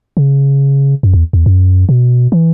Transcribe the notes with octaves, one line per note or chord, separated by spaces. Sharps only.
C#3
F#2
E2
E2
F#2
B2
E3